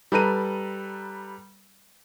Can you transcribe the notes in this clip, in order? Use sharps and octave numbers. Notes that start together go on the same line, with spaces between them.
G3 A4 B4 A#5 D#7